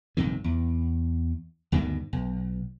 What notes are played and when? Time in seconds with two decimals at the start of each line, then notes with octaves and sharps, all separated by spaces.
0.17 A#1 G2 C3 D#3
0.44 E2
1.72 D2 G2 B2 D#3
2.13 B1